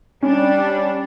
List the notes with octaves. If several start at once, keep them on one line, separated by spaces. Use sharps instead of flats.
G3 C#4 D4